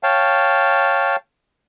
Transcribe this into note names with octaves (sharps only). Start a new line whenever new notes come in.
C#5 F5 G5 A5